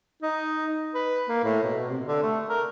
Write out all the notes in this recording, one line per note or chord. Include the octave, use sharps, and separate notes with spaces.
D#4
B4
A#3
A2
B2
C3
D3
A3
A#4